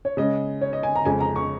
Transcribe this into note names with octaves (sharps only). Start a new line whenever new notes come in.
C#5
C#3 G#3 C#4 D#5
C#5
D#5
G#5
A#5
F2 C#3 G#3 G#5
A#5
C#6